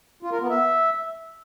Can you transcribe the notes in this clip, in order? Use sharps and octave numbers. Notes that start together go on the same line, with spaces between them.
F4
A#4
B3
E5